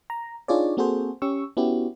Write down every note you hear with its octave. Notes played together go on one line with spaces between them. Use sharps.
A#5
D4 D#4 F4 G#4 C#5 D5
A#3 C4 F#4 G#4 A4 C5
C#4 G4 C#6 E6
B3 C#4 E4 F#4 G4